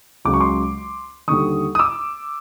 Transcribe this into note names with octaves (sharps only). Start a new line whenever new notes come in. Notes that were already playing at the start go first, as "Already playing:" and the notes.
C#2 C#3 F#3 D6
C#6
C6 D6
D#2 D3 G3 C#6 D#6
D#6
D6 E6